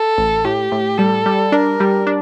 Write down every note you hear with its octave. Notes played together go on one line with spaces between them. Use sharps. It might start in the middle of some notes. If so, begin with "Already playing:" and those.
Already playing: A4
A1
A2 G4
A2
G3 A4
G3
D4 A#4
G3
D4